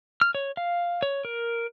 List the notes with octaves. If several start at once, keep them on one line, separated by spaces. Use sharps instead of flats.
F6
C#5
F5
C#5
A#4